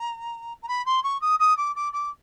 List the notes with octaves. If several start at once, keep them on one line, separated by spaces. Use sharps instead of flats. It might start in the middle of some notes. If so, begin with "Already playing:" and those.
Already playing: A#5
A#5
B5
C6
C#6
D#6
D#6
D6
D6
D6